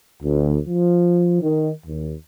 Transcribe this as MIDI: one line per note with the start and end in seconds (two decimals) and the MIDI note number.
0.23 0.59 38
0.68 1.39 53
1.42 1.70 51
1.85 2.14 39